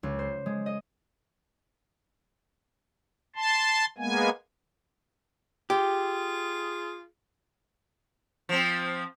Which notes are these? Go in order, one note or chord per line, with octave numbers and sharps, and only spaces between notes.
C#2
C5
G#3
D#5
A5 C6
G#3 A#3 B3 G#5
F4 G4 G#4
F3 C4